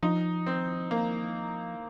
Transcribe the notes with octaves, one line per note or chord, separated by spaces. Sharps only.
F3 D#4
C4
A#3